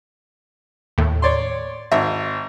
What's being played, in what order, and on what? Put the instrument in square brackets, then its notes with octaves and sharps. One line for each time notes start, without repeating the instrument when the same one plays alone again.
[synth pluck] D#2 A2
[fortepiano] C#5 D5 C6
[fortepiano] G#1 [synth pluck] E5